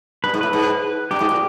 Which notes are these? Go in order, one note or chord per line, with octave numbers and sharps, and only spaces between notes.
G2 B4
G#2
A2 B4
G#2
G2 G4
G#2
A#2